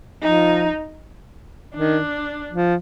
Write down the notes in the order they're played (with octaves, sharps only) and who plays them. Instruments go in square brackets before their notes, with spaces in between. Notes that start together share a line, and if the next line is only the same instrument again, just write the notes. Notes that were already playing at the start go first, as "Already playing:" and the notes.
[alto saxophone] F3 [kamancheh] D#4
[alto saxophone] D#3 [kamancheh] D4
[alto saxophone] F3